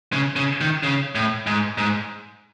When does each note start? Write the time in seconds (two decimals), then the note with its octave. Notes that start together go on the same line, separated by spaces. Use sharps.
0.13 C#3
0.36 C#3
0.61 D#3
0.83 C#3
1.15 A2
1.47 G#2
1.78 G#2